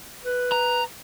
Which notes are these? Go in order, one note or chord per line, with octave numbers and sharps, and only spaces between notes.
B4
A#5